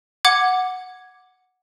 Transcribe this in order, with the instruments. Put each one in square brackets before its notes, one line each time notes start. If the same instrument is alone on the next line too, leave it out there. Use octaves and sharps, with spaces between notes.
[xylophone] F#5 D6 G#6